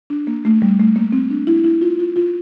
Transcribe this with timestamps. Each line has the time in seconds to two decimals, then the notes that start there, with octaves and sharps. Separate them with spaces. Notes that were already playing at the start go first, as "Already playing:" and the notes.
0.10 D4
0.27 A#3
0.45 A3
0.62 G3
0.79 A3
0.96 A#3
1.12 C4
1.30 D4
1.47 E4
1.64 E4
1.82 F4
1.99 F4
2.16 F4